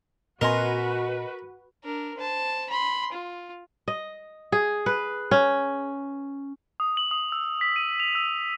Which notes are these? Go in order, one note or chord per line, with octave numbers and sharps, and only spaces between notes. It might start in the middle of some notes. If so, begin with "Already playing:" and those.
A#2 C4 F#4 A#4 B4 D#5 G#5 C6
D4 A#4
C5 A5
B5 C6
F4
D#5
G#4
B4
C#4
D#6
F#7
D#6
E6
B6
D#7
F7
E6